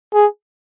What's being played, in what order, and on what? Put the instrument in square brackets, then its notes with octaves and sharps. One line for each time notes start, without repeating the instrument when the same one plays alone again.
[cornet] G#4